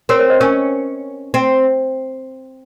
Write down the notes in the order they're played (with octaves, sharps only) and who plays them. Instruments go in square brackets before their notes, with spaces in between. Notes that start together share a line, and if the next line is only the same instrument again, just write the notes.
[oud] C4 [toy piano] A#4 C#5
[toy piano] A#4 C#5
C5 D#5
[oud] C#4 [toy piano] A#4 C#5
[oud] C4